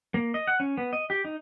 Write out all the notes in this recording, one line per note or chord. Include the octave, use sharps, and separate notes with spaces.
A#3
D#5
F#5
C#4
B3
D#5
G4
D#4